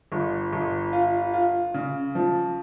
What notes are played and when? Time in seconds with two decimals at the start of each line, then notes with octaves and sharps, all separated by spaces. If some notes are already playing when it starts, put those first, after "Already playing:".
0.12 G1
0.52 G1
0.93 F4
1.34 F4
1.74 C#3
2.15 F3